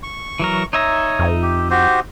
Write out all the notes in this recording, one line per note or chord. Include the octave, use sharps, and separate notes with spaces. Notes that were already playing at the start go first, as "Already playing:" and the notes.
C#6
E3 F#3 A#4
D#4 C#5 E5 A#5
F2
G4
F#4 G4 C5